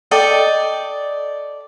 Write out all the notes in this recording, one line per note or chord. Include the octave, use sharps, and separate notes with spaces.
A4 D5 D#5 G5